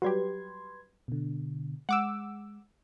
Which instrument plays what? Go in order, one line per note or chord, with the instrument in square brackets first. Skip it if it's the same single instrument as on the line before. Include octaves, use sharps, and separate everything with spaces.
[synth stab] F#3 G3 G4 [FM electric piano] B4 C6 G#6
[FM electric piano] B2 D3
[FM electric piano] G#3 [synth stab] F#5 D6 E6